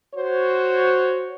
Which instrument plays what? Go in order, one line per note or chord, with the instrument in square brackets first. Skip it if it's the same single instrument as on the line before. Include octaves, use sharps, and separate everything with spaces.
[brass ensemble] F#4 C5 C#5